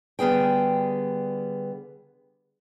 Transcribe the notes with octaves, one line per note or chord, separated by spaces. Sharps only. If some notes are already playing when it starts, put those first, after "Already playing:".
D3 G3 B3 G#4 G5